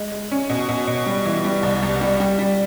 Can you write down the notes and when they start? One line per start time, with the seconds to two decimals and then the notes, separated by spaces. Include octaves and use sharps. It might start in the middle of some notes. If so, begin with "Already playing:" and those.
Already playing: G#3
0.12 G#3
0.32 C#4
0.49 B2
0.68 B2
0.87 B2
1.06 G3
1.25 E3
1.45 G3
1.63 C2
1.83 C2
2.01 G3
2.20 G3
2.39 G3